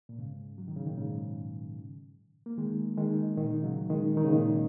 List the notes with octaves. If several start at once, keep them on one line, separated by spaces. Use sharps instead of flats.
A#2
G#2 C#3
F#3
D#3
C#3
A#2 D#3
G#2 C#3
A#3
D#3 G#3
D#3 G#3
A#2 D#3
C#3 F#3
D#3 G#3
D#3
C#3
A#2 D#3